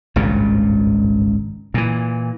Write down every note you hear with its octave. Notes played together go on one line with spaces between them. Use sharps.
G#1 C#2 G2 A#2
A#2 E3